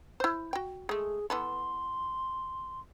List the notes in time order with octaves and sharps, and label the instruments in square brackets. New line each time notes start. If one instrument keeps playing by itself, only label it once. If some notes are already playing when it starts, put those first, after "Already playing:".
[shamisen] E4 C5
F#4 G5
[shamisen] G#3 A3 [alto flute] G#4
[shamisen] E3 B3 A4 [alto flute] C6